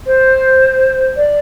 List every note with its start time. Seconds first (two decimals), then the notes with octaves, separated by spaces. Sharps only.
0.06 C5
1.16 D5